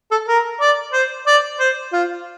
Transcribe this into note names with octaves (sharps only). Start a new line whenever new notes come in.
A4
A#4
D5
C5
D5
C5
F4